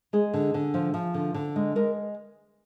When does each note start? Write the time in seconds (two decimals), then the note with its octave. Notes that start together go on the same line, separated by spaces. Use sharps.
0.13 G#3 G#4
0.34 D3
0.54 D3
0.74 F3
0.94 F3
1.14 D3
1.34 D3
1.56 G#3
1.76 G#3 A#4